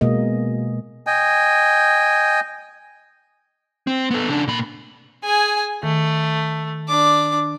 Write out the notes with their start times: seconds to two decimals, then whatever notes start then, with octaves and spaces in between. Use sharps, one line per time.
0.01 B2 G#3 A#3 D#5
1.07 D#5 G5 G#5
3.87 C4
4.11 B3 A4
4.29 C#3 D4
4.48 A#2 B5
5.24 G#4 G#5
5.83 D#3 A3
6.88 D4 D6